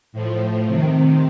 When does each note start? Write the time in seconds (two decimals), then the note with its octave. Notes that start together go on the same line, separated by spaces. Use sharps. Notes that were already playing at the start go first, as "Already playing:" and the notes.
0.12 A2 F3
0.67 C3 D#3